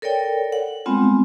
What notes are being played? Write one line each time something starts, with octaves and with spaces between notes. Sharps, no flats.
A4 A#4 C#5 D5 G5
F#5
G3 G#3 B3 C4 F4